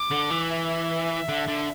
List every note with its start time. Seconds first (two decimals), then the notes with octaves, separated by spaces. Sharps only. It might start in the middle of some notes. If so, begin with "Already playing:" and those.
Already playing: D6
0.11 D3
0.30 E3
0.50 E5
1.29 D3
1.48 D3